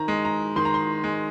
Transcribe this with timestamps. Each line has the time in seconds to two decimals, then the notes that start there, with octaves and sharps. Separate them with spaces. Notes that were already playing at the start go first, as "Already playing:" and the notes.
Already playing: D#3 A#5
0.08 G#3
0.25 A#5
0.56 D#3 C6
0.65 A#5
0.74 C6
1.04 G#3